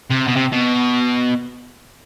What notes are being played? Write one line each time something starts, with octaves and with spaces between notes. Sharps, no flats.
C3
B2
C3
B2